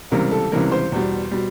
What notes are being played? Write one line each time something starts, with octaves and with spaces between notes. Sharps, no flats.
C#2 C3 E3 G3 A#4
A4
C#2 C3 E3 G3 A#4
C5
E2 B2 G3
B2 G3